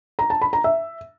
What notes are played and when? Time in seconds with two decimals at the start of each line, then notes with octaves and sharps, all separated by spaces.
0.19 A#5
0.30 A5
0.42 B5
0.53 A#5
0.64 E5